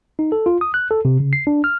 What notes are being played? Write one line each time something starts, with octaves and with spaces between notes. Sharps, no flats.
D#4
A4
F4
D#6
F#6
A4
C3
C#3
C7
D4
F6